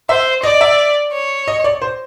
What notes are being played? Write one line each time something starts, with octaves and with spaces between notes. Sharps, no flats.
C5 E5
D5 D#5
E5
C#5
D#5
D5
C5